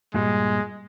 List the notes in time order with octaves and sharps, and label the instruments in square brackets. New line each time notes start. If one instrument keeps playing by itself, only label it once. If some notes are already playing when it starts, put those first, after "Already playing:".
[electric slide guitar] G2 A#2 G3 [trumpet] G#3